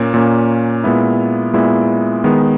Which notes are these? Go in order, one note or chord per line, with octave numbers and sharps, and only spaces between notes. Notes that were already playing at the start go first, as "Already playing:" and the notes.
Already playing: A#2 A#3 C#4
A#2 A#3 C#4
A#2 G#3 B3 E4
A#2 G#3 B3 E4
D#3 G#3 B3